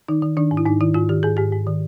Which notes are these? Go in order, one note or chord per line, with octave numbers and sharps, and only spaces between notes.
D#3 D#4
D#3
D#3 D4
G#2
E4
G#2 D#4
D#3 E4
G#2 F4
D#3 G4
G#2 G#4
G#2 G4
G#2
D#3